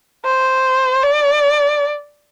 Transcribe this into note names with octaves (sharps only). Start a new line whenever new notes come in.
C5
D5